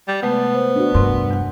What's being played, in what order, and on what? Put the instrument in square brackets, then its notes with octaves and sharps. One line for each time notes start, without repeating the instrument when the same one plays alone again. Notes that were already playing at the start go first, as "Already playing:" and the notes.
[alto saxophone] G3
[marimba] C3 G#3 A3 [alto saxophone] B3
[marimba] C5
[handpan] D4 F#4
[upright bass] G2 [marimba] C3 A#4 C6
[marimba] E2 F#5